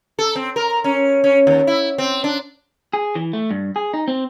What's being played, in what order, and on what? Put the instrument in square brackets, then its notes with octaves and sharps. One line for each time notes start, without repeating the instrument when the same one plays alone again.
[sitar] A4
C4
A#4
C#4
C#4
D#2
E4
C4
D4
[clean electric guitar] G#4
E3
A3
G2
G#4
D#4
C4